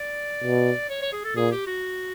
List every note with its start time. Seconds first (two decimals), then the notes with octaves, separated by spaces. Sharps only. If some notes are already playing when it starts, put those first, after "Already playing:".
Already playing: D5
0.44 B2
0.90 C#5
1.02 C#5
1.13 G#4
1.24 A4
1.36 A#2 G#4
1.52 G4
1.67 F#4